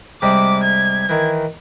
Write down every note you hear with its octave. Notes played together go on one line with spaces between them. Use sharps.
C3 G3 G#3 D6
G#6
D#3 E3